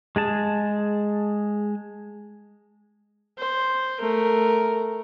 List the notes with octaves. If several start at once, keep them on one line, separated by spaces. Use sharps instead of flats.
G#3 G#4 A5
C5
A3 A#4